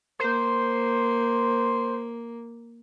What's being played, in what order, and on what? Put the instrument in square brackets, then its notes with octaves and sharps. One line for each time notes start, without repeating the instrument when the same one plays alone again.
[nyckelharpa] A#3 [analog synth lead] C5